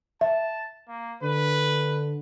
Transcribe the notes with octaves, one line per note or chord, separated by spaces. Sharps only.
E5 A5
A#3
D3 B4